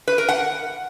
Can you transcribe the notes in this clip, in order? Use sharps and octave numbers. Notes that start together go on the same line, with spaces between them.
B4
A#4
F#5